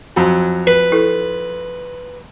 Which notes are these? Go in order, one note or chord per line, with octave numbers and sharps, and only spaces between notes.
F2 F#3
B4
E4 A4